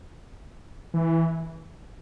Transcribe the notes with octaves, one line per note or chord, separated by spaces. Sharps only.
E3